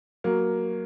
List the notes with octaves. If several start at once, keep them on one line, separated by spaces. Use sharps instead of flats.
F#3 A#3